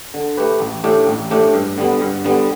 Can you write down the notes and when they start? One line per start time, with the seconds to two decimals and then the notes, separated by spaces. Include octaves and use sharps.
0.14 D3
0.37 A3 G4 B4
0.60 A1
0.84 A2 A3 D4 G4
1.07 A1
1.31 A2 A3 D4 G4
1.54 G2
1.78 D3 G3 B3
2.01 G2
2.25 D3 G3 B3